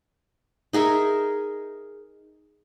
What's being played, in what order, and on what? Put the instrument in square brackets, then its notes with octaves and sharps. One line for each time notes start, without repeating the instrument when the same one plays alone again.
[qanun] D#4 G#4 A#4 E5